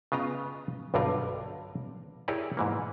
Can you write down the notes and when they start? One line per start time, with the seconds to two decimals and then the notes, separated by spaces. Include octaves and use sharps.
0.12 C#3 B3 F4 D#5 G5 A#5
0.94 B1 G2 D3 G3 F4 A#4
2.28 E4 G4 G#4 A#4 C#5 D5
2.57 G#2 E3 A#3